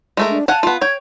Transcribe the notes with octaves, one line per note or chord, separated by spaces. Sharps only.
G#3 A3 A#4
D4
F5 F#5 G#5 A5
B3 F4
C#5 G5 G#6